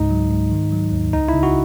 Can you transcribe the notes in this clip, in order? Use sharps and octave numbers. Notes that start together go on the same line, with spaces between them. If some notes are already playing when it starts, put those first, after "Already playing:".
Already playing: C#2 G#2 D#4
F#3
G#2
D#3
F#3
D#2
C#2 D#4
C#3 E4
F#4